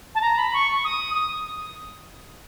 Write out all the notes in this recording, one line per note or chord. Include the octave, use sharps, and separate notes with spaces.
A5
A#5
B5
C#6
D#6
D#6